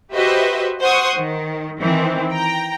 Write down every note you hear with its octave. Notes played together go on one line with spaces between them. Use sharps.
F#4 G4 B4 C5 D#5 E5
C5 F#5 C6 C#6 D#6
D#3
D#3 E3 C4
G5 A#5